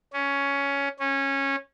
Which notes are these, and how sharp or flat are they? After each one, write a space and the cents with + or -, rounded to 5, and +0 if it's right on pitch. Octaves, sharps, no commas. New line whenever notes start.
C#4 +10
C#4 -15